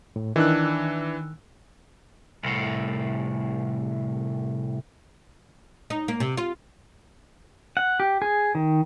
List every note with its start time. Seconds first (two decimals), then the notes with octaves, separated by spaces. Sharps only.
0.16 A2
0.36 D#3 E3 D4 E6 F#6
2.43 C2 A2
5.90 D#4
6.08 A#3
6.20 C3
6.37 F4
7.77 F#5
8.00 G4
8.22 G#4
8.55 D#3